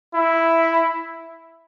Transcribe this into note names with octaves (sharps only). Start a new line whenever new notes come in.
E4